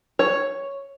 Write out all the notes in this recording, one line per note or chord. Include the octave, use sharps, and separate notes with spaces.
C#5